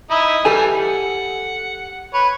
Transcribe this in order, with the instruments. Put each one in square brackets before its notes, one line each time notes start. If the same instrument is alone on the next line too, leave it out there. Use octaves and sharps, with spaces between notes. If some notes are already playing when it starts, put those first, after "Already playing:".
[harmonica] D#4 E4 D#5
[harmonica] E3 G3 [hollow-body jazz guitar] G4 A4 G#5
[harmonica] F#5
B4 C#5 B5